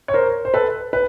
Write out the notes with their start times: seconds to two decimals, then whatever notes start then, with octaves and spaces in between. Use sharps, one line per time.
0.08 C#5
0.13 A#4 C5
0.45 C5
0.54 A4 B4
0.93 B4